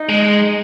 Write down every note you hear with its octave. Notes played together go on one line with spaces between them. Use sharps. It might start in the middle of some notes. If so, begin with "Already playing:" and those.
Already playing: D#4
G#3